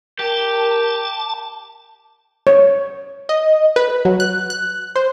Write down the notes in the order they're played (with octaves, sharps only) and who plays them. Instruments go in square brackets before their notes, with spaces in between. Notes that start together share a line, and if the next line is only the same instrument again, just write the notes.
[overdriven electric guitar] G4 [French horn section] A#4 [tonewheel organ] A5
[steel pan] C#5
[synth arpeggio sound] D#5
B4
F#3
F#6
F#6
C5